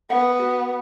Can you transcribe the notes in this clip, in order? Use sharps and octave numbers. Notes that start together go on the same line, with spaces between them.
B3 F#5
F#4